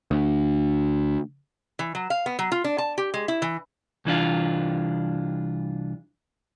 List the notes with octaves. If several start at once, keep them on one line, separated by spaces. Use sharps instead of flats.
D2
E3
F#3
F5
B3
F#3
F4
D4
A5
G4
G#3
E4
E3
C2 E3 D4 F4